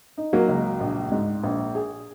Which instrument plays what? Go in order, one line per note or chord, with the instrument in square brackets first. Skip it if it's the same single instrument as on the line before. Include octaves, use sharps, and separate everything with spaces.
[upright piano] D#4
[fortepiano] F#3 A#3
[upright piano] C#2
A#1
G#2
A#1
G#4